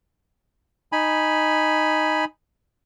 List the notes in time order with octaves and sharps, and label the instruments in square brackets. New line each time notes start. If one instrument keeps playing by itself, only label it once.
[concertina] D#4 G#5 B5